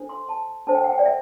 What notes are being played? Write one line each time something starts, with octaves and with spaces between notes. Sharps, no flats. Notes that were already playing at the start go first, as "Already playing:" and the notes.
Already playing: D4 A4 C5
C6
A5
D4 A4 C5 A5
G5
F#5
G5
D5
E5